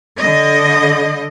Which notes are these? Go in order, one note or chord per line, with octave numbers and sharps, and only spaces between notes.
D3 D#5